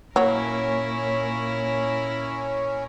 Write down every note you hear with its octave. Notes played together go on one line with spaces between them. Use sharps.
A#2 F#3 A#3 C#4 E4 A#4